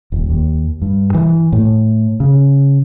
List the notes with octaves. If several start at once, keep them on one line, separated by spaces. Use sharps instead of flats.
D#1
D#2
G2
E3
A2
C#3